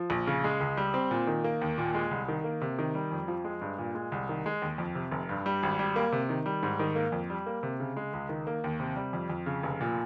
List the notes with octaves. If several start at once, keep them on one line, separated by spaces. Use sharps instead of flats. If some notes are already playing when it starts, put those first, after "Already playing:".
Already playing: F3
A#1
C#3
G#3
C#2
G3
C4
A#2
D#3
A#3
D#2
A#2
G#3
C2
D#3
A#3
C3
D#3
G3
F2
F3
G#3
G2
A#2
G#3
C2
D#3
G#3
D#2
F2
C3
F1
G2
G3
G#1
G3
A#3
C3
D#3
G3
G#2
D#3
A#3
F2
G3
A#3
C3
C#3
G#3
C#2
D#3
A#3
D#2
C3
G3
F2
F2
C#3
F1
A#2